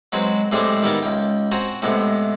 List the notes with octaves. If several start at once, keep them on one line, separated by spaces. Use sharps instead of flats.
F#3 G#3 C4 B4
A2 G3 G#3 C4 D4 G#4
D#3 G3 B3 E4 A#4 A5
C#2 G5
C4 F#4 G#5 A#5 C6
A2 C3 G#3 B3